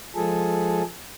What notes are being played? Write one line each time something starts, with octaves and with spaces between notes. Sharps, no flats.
F3 G#3 G#4 A4